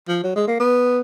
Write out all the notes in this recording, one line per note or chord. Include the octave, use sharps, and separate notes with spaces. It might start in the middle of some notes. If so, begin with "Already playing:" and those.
F3
F#3
G#3
A#3
B3